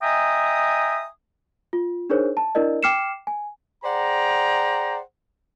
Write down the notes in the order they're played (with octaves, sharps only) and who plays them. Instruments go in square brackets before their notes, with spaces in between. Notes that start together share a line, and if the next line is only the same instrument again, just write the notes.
[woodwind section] D#5 E5 G5 G#5 A#5 D#6
[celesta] F4
D4 D#4 G#4 A#4 C5 C#5
A5
D4 E4 A#4 D5 D#5
G5 D6 F6 C7 C#7 E7
G#5
[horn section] G#4 C5 D5 F#5 G5 A#5